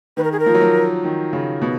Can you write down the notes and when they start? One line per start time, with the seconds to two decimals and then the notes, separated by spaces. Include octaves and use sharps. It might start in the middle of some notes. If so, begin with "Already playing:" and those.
0.17 D#3 B4
0.24 A#4
0.32 G#4
0.40 A#4
0.46 F3
0.54 F#3
0.61 F3
1.04 D#3
1.33 C#3
1.61 B2